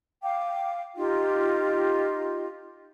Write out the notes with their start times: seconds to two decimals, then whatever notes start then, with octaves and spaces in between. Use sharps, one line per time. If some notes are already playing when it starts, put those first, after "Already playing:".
0.23 F5 G5 D6
0.96 D#4 F4 G4 D#5